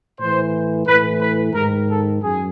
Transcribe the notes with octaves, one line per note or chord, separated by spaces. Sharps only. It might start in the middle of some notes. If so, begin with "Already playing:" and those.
A2 E3 C5
A2 E3 B4
B4
G#2 D#3 A#4
A4
F#2 G#4